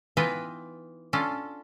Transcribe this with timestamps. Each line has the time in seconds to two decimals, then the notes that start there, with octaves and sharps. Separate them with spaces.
0.17 E3 B3 D#4 F4 B4 G5
1.13 C#4 D4 F4 A4